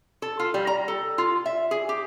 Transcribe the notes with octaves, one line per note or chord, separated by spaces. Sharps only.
A4
F4
G3
A#5
A4
F4
E5
G#4
G4